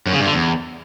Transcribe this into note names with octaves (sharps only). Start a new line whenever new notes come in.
F#2
C#3
G2
D3
E2